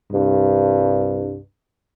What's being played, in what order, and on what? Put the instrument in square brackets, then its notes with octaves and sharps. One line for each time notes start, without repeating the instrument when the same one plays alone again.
[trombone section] C2 G2